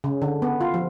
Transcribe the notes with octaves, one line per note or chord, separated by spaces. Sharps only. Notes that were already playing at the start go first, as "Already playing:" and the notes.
C#3
D3
B3
F4
F3